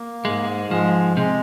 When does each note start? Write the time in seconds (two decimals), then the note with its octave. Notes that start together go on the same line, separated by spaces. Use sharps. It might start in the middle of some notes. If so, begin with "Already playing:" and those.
Already playing: A#3
0.25 G#2 G#3
0.71 F3 G#3
1.17 C3 G#3